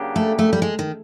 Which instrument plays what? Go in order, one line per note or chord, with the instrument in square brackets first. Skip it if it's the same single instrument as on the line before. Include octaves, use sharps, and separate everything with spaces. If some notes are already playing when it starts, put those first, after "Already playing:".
Already playing: [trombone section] C#3 F#3 A#3 D4 G4
[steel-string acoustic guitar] A3
A3
G3
G#3
D#3